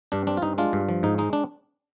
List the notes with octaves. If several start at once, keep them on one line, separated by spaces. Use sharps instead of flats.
G2 D4
C4 D4
F4
G2 D#4
G#3 D4 F4
G2
F3
G#2 D#4
G#3 D#4
D4